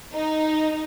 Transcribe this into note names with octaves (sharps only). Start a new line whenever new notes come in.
D#4